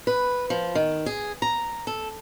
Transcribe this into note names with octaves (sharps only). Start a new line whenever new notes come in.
B4
F3
D#3
G#4
A#5
A4